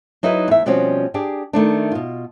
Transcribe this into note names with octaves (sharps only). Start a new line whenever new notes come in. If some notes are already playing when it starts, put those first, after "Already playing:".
F#3 D#4 E4 F#4 B4
E2 E5
B2 F3 G3 C4 C#4 F#4
D4 G4 G#4
D#3 A3 D4
B2 F4